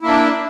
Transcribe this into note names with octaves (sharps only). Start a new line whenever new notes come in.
A#3 D4 E4